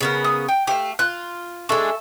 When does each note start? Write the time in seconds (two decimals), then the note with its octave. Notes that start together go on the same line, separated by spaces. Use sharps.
0.01 C#3 B3 A#4
0.24 D#6
0.48 G5
0.67 A3 G4 F5
0.99 F4 F#6
1.69 G#3 D4 A4 E5 C#6